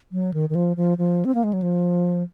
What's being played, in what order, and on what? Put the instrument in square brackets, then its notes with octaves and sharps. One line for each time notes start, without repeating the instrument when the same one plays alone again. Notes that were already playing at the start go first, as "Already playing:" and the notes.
[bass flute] F#3
D#3
D#3
F3
F3
F3
C4
A#3
G#3
F#3
F3